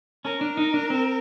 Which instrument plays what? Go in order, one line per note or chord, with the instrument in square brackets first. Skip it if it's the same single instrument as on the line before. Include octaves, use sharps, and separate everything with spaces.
[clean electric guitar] C#4 [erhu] A#4
[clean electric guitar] D4
D#4
D4
C4